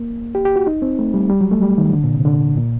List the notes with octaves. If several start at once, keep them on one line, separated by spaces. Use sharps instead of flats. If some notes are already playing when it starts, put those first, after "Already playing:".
Already playing: A#3
G4
G4
F#4
D#4
C4
A3
G3
G3
F#3
A3
G3
D#3
D3
A#2
C3
D3
A#2